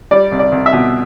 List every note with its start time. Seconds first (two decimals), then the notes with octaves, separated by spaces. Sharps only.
0.11 G3 D5
0.32 C2
0.39 D5
0.52 C2
0.66 E5
0.73 B2